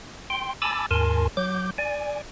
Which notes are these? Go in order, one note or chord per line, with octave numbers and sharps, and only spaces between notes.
G5 C6
G#5 A5 B5 D6 E6 A6
D#2 G#2 A#4 G#5 A5 C6
F#3 D6 G6
D5 G#5